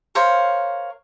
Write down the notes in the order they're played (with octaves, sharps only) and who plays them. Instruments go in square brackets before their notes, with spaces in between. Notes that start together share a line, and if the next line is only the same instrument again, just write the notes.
[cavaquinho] A#4 C5 C#5 F5